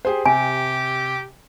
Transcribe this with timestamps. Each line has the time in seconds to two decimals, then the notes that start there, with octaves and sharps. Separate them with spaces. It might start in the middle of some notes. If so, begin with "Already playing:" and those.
0.05 G4 G#4 C5
0.25 C3 G4 G#5